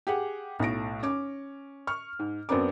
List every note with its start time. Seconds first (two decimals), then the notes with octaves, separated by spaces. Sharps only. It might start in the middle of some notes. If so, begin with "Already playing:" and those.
0.07 G4 G#4 F#5
0.60 B1 A2 A#6 D7
1.03 C#4 D6
1.87 C#6 F6
2.19 G#2
2.49 F#2 B3 C4 D4 A#4 D6